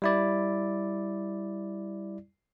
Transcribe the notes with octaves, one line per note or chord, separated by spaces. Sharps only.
G3 E4 D5